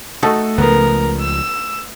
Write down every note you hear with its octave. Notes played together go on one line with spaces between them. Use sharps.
A3 D#4 F#4 A4
C#2 C#3 F3 B3 A#4
E6